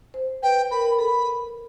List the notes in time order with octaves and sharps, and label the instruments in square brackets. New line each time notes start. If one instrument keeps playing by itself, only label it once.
[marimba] C5
[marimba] B4 [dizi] G5
[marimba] A#4 [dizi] B5
[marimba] A4 [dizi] B5